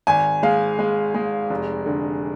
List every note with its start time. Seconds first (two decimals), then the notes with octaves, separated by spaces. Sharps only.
0.07 G#1 G#5
0.43 G#3 F5
0.79 G#3
1.14 G#3
1.50 F1
1.86 D3